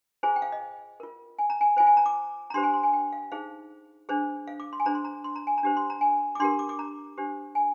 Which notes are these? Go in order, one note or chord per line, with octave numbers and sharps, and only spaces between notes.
F4 G#4 C5 G#5
G5
F5
D#5
F4 A#4
G#5
A#5
G#5
F4 C5 G#5
G#5
A#5
D6
A#5
D4 G4 C5 C6
G#5
C6
G#5
G5
F5
D#4 G#4 C5 F5
D4 G#4 C5
F5
D6
C6
G#5
D4 G#4 C5 A#5
C6
A#5
C6
A#5
G#5
A#5
D4 G4 C5
C6
A#5
G#5
D6
D4 G4 A#4 C6
D6
D6
A#5
D4 G4 C5
G#5